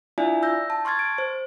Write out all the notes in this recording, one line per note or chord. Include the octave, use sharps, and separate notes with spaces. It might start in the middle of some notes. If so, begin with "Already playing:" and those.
D4 E4 F4 D5 E5 G#5
E6 G6 A#6
A5
C6 C#6 F6 G#6 A6
D7
C5